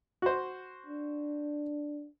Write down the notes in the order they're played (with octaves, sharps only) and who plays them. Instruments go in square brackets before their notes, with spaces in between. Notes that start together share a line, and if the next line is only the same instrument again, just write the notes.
[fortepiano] F#4 C5
[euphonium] D4